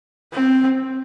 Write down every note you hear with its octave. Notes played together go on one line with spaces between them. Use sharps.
C4